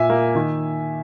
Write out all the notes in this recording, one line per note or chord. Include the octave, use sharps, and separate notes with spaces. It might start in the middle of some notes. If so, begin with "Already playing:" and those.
Already playing: A#2 E5 G#5
A#3
D#3